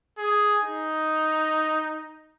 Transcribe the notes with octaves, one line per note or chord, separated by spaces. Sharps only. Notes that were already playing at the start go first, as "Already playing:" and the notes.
G#4
D#4